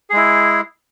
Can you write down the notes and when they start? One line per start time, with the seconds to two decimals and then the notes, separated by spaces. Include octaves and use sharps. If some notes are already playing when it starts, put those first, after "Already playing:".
0.10 G#4
0.13 G#3
0.16 E4